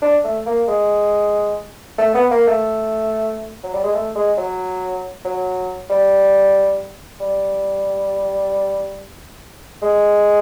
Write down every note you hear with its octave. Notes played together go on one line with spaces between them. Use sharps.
D4
A3
A#3
G#3
A3
B3
A#3
A3
F#3
G3
G#3
A3
G#3
F#3
F#3
G3
G3
G#3